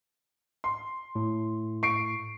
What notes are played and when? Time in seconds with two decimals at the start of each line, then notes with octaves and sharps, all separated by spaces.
0.64 C6
1.15 A2
1.83 C#6 C7 D7